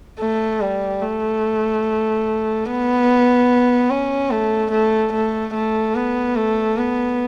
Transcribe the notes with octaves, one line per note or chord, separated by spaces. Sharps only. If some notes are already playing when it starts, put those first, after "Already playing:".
A3
G3
A3
B3
C#4
A3
A3
A3
A3
B3
A3
B3